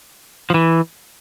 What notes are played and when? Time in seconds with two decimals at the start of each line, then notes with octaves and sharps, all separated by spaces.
0.50 F3
0.54 E3